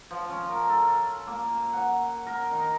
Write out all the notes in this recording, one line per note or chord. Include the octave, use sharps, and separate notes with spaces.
F3
C#4
A#4
A4
A#3
F#5
A#4
D#3